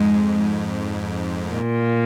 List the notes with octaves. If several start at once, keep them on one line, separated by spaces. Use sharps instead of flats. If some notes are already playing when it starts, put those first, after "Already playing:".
Already playing: F2 G#2 G#3
A#2